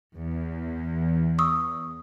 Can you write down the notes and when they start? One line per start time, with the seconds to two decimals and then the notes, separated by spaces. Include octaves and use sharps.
0.16 E2
1.39 C#6 D#6 E6